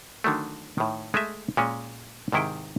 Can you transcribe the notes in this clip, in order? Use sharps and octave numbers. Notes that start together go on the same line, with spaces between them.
D3 D#3 F#3 A3
A2 D#3
G#3 A3 D#5 E5
A#2 G#3 C#4
G#2 C3 D#3 E4 G#4 G5